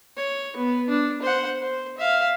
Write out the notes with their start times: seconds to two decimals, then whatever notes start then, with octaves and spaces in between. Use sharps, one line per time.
0.17 C#5
0.57 B3
0.89 D4
1.22 C5 F#5
1.61 C5
1.97 E5 F5